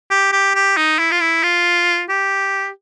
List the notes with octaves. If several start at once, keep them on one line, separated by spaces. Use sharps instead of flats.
G4
G4
G4
D#4
E4
F4
E4
F4
G4